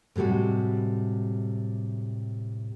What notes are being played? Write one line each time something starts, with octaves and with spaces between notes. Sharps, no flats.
A2 C3 G3 G#3 F#4